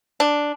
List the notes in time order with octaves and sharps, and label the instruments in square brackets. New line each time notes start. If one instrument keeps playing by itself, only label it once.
[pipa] D4